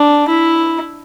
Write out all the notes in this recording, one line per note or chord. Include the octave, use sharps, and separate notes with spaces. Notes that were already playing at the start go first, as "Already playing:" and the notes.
Already playing: D4
E4